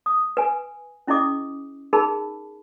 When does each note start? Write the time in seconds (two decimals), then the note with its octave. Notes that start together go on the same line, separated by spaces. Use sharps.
0.06 D#6
0.37 B4 G#5
1.07 C#4 E4 G#4 D#5 D6 D#6
1.93 D#4 G#4 A#4 A5 B5